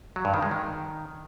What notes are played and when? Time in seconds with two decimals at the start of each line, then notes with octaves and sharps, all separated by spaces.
0.16 F#3
0.25 G2
0.34 D#3
0.42 G#3
0.51 D#3